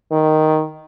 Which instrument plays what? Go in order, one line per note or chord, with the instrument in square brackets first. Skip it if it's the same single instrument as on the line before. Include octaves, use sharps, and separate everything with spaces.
[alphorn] D#3